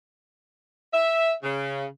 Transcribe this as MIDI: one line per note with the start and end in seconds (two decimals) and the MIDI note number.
0.94 1.33 76
1.43 1.86 49